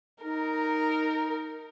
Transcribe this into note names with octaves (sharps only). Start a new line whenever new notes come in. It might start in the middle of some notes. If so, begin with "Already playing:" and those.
D#4 A#4